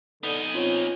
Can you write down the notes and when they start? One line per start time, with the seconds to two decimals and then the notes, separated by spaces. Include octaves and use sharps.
0.23 D3 B3 D#4 D#6
0.55 C4 C#4 F4 C#5